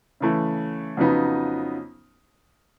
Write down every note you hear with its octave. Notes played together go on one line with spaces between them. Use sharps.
C#3 E3 A3
F2 C#3 F#3 B3 D#4